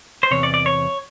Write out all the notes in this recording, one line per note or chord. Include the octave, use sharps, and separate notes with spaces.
C5
E2 C3 C#5
D5
D5
C#5